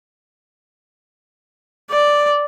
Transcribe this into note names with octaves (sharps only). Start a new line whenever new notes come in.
D5